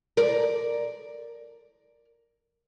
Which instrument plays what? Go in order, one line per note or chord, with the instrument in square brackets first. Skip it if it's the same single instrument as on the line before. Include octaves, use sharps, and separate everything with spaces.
[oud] A#4 D5